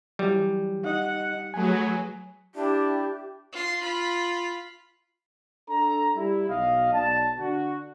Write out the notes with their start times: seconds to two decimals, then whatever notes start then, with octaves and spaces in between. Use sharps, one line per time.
0.19 E3 F#3 G3
0.85 D#4 D#5 F#5
1.54 F#3 A3 G#4 B4 G#5
2.55 D4 E4 G4
3.52 F4 C6
3.82 F4 B5
5.69 D4 A4 A#5
6.15 G3 E4
6.48 B1 B2 D#5 F5
6.92 B1 D5 A5
7.39 D3 D4 F#4